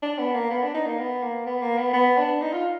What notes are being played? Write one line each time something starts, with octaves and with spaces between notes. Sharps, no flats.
D4
B3
A#3
B3
D4
D#4
A#3
B3
A#3
B3
A#3
B3
B3
D4
D#4
F4